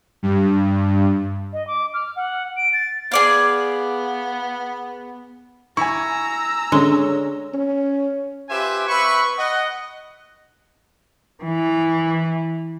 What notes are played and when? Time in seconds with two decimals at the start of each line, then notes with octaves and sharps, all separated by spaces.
0.23 G2
1.53 D#5
1.67 D6
1.94 F6
2.16 F#5
2.57 D7
2.73 A6
3.12 B3 G#4 D5 F5
5.77 E4 G#5 A#5 C#6 E6
6.72 D3 G#3 C#4
7.54 C#4
8.48 F4 G4 B4 C5 E5 G#5
8.88 C4 B4 E5 B5 C#6
9.37 D#5 F#5
11.44 E3